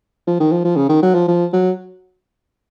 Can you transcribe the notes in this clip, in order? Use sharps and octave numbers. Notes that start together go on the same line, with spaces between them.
F3
D#3
F3
F3
C#3
D#3
F#3
F3
F3
F#3